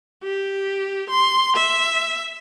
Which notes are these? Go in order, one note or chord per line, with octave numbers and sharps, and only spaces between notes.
G4
C6
E5